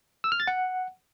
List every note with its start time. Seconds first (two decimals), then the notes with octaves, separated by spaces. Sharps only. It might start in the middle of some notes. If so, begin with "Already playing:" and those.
0.24 E6
0.32 F6
0.40 A6
0.47 F#5